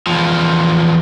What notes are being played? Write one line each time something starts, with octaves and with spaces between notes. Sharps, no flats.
E2 F3